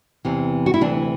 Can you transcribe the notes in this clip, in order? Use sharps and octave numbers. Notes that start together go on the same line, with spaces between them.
E2 C3 E3
F#4
E4
D2 C3 E3 D4